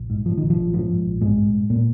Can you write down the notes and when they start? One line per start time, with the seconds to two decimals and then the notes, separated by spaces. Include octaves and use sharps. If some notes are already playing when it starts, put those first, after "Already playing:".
Already playing: A#1
0.10 G#2
0.25 G#2 F3
0.38 A#1 D#3
0.50 F3
0.57 A#1
0.73 G#2 F3
0.90 G#2
1.06 A#1
1.21 A#1 G#2 G#3
1.37 G#2
1.54 G#2
1.70 A#2 A#3